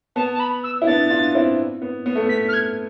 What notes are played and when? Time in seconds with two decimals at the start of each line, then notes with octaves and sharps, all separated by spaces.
0.16 B3 A5
0.33 A5
0.40 B5
0.64 E6
0.82 E4
0.87 B3 D4 A6
1.10 D4 F4
1.35 C4 E4
1.82 B3
2.06 B3
2.15 A3
2.25 B3 B6
2.48 F6
2.53 G#6